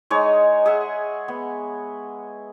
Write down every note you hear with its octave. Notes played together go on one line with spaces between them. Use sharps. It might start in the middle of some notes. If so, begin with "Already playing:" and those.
G#3 D#4 C#5 D#5
G#4 E5 F#5
B3